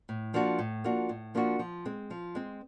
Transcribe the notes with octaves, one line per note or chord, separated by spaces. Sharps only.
A2
F3 A#3 D4 F#4
A2
F3 A#3 D4 F#4
A2
F3 A#3 D4 F#4
F3
G#3 C4
F3
G#3 C4